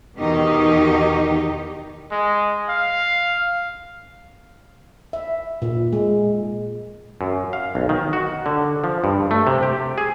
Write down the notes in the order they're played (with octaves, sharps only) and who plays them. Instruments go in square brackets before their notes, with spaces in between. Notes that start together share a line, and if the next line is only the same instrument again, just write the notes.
[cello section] E2 B2 D#3 D#4 G4
[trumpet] G#3
F5
[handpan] E5
A#2
G#3
[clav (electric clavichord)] F#2
F5
B1
D#3
F#4
D3
F3
G2
A3
C3
G4
G#4